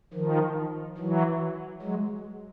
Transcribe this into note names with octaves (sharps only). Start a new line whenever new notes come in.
D#3 F3
E3 F#3
F#3 G#3